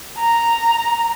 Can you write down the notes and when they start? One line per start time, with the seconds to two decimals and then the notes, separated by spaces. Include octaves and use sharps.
0.18 A#5